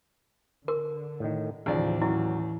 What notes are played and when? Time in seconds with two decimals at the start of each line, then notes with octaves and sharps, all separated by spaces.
0.68 D3 A#4
1.20 A2 D#3
1.66 D#2 A2 C#3 E3 F3 D5
2.02 F#3 C#4 E4